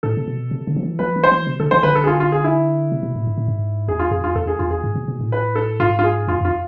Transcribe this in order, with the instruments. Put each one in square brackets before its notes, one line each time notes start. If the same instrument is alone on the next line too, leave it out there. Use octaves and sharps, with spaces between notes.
[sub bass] A2 [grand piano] A4
[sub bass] C3
B2
C3
D3
F3
E3
[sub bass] F3 [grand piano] B4
[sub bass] E3
[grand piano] C5
[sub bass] E3
C3
[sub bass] D3 [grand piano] A4
[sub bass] E3 [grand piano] C5
[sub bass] D3 [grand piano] B4
[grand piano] A4
G#4
F4
F4
G#4
E4
[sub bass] C3
B2
A2
G#2
A2
G#2
[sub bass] E2 [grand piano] G#4
[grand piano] F4
[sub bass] F2 [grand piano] G#4
[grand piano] F4
[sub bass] E2 [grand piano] A4
[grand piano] G#4
[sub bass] E2 [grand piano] F4
[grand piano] G#4
[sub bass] G#2
B2
B2
A2
[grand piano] B4
A4
[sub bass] G#2 [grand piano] F4
[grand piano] F4
G#4
[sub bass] F2 [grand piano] F4
[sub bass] F2 [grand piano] F4